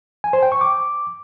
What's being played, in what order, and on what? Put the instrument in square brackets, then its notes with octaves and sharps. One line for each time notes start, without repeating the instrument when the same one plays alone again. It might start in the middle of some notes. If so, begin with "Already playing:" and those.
[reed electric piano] G#5
C5
G5
C#6
D6